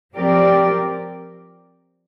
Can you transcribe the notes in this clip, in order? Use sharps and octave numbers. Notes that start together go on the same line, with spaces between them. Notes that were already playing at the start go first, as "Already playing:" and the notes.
F3 C4 G4 A#4 D5